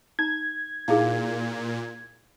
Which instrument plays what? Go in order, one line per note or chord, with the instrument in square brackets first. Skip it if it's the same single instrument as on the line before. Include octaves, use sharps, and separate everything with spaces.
[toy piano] D#4 A#5 [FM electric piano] G#6
[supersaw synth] A#2 [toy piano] D#4 E4 G#4 [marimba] F5